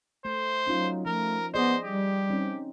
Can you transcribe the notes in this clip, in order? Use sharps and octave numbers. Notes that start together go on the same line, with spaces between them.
A3 C5
F#3 C#4 D#4 F4
F3 A3 A#4
B3 G#4 C5 D5 D#5
G3 G4
C4 C#4 D#4